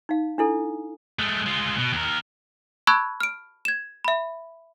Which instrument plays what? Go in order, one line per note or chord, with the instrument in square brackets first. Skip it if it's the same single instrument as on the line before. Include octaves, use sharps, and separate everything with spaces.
[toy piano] D#4 F5
D4 E4 A4
[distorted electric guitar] G#3 A3
G#3 F4
B2
D#2 A#4
[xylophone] A5 B5 C#6 E6 F#6 G#6
F6 D7
G#6 E7
E5 B5